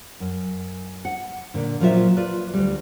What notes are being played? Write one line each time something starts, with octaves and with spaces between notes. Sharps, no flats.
F#2
F#5
A#2 D3
A#2 F3 F#3 F4 A4 E5
F4 B4 D5
D2 G3